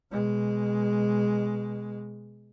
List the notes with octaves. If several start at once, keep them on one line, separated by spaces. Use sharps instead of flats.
B2 G#3